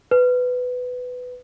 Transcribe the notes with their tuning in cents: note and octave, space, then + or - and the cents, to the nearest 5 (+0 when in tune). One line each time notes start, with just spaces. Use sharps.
B4 +15